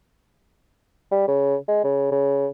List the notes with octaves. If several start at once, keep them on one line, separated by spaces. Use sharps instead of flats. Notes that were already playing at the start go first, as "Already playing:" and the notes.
G3
C#3
G#3
C#3
C#3